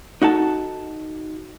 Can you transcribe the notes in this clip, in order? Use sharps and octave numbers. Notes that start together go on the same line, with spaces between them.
D#4 F#4 A4 A5